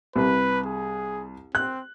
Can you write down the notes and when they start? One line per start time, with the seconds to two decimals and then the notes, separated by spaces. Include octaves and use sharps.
0.16 C2 B4
0.66 G#4
1.55 C4 F#6